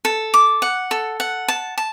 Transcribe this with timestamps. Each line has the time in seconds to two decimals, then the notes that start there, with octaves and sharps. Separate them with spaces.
0.05 A4
0.34 D6
0.62 F#5
0.91 A4
1.20 F#5
1.48 A5
1.78 A5